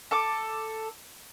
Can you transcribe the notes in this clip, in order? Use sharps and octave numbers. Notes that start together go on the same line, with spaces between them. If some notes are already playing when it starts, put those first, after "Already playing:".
A4 D6